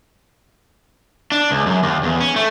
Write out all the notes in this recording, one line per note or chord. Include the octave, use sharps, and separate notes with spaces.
D4
C#2
F#2
D#2
E2
C#4
A3